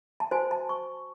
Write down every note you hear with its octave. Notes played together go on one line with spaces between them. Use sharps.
A5
F#4 C5 G#5
A5
C#6